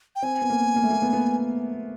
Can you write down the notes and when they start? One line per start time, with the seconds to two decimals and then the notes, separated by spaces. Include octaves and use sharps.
0.16 G5
0.22 C4 G#5
0.42 B3
0.50 A#3
0.76 A#3
0.83 A3
0.91 A#3
1.02 B3
1.13 B3